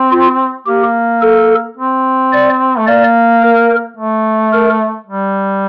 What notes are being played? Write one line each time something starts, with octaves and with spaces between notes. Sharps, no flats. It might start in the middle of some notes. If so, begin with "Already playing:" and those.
Already playing: C4
F4
A#3 G4
A4
C4
D5
A3
A#3 D5
A#4
A3
A#4
G3